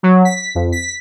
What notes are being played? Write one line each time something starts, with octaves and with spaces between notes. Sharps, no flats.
F#3
B6
F2
B6